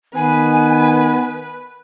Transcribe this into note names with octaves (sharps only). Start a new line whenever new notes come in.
D#3 B3 B4 G#5